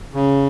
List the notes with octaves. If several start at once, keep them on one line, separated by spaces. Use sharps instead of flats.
C#3